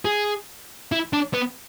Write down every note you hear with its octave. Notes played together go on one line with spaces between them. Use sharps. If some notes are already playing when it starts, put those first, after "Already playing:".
G#4
E4
D4
B3